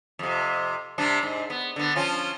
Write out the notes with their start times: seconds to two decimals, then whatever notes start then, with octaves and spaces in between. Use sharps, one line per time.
0.19 F2 C3
0.98 C3 G3 D4
1.23 G#2
1.50 B3
1.76 D3 B3
1.96 F3 C#4 F4